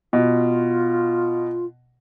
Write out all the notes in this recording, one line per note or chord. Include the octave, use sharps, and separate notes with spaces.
B2 F4